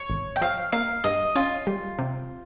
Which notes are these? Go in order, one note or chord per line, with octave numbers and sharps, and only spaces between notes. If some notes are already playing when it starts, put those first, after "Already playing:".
Already playing: C#5
G#1
G5
F3 F5
A#3 F5
G2 D#5
C#4 F4
G3
C3